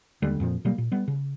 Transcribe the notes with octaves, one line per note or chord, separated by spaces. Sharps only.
D#2 D3 G3 G#3
F2 A#2 F3
B2 F#3 G3 A#3
A#2
G3 B3
C#3